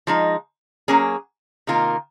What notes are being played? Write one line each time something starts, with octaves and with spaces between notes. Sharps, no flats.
F3 G#3 D#4
F#3 A#3 C#4 G#4
C3 D#3 A#3 F4